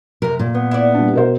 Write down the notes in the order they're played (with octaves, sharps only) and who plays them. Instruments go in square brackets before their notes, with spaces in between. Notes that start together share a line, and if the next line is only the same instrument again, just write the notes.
[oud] F#2 C3 [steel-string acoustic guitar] A#4
[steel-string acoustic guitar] A#2
[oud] F#2 [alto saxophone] B3
[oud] E4 D5
[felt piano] G3 D4
B2 A#4 C5